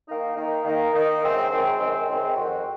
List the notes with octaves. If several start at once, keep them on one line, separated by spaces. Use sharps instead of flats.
D#3 A#3 D#4
D#3 A#3 D#4
D#3 A#3 D#4
D#3 A#3 D#4
F#2 D#3 G#3 C4
F#2 D#3 G#3 C4
F#2 D#3 G#3 C4
F#2 D#3 G#3 C4
F2 D#3 G#3 C4 F#4